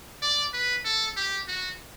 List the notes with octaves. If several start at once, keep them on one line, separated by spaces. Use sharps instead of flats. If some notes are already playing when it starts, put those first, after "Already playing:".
D5
B4
A4
G4
F#4